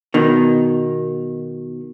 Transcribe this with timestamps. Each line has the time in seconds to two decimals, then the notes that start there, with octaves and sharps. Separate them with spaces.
0.14 B2 D#3